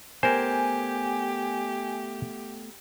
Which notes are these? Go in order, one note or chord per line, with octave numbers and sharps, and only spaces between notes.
A3 B3 G4 A#4 C5 D5 G#5